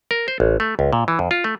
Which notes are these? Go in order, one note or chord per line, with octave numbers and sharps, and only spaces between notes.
A#4
C5
A1
A3
C#2
A#2
E3
F2
F4
A3